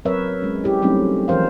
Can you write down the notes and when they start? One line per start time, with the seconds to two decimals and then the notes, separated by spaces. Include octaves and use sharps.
0.05 F#3 C4 A#4 B4 C#5 E5
0.42 G#3 C#4
0.64 E4 G4
0.82 F#3 G3 A3 C4 C#4 D#4
1.28 E3 F3 A#4 C5 F5